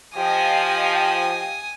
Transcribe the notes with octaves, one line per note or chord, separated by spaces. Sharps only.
F3 G4 D#5 F5 G5 G#5 D#6